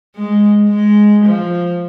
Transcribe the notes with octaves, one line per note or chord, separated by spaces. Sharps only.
G#3
G#3
F3